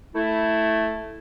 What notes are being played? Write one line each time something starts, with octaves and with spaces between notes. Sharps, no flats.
A3 E4